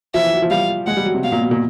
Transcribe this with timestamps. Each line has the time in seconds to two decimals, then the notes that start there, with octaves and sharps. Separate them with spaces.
0.14 F3 E5
0.23 E3
0.33 F#3
0.42 F3
0.51 G3 F5
0.87 G#3 F#5
0.97 G3
1.05 F#3
1.14 C3
1.23 B2 F5
1.32 A#2
1.41 B2
1.51 A#2